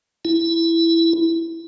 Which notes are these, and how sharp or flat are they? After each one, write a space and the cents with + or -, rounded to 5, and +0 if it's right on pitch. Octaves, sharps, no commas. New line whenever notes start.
E4 +5